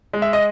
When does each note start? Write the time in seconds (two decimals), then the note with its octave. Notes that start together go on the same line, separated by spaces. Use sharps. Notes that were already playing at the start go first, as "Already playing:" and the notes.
0.13 G#3
0.22 E5
0.33 D#5